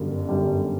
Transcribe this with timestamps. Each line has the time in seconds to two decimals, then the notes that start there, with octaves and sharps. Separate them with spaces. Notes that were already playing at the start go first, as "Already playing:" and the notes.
Already playing: G1 F#2 D3 G3
0.29 G1 F#2 D3 G3